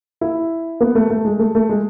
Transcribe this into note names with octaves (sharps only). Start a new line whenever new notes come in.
E4
B3
A3
A3
G#3
A3
A3
G#3